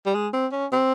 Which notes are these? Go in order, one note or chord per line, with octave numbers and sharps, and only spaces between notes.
G3
G#3
C4
C#4
C4